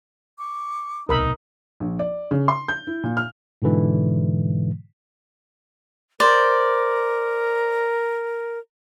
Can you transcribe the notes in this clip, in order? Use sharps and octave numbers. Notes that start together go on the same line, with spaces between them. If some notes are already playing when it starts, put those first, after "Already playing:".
C#6 D6
D1 C2 B2 D#4 A#4 B5 E6
A#1
D5
C#3
C6
G6
E4
A#2
F6
G#2 B2 D3 E3 G#3
A#4 C5 D5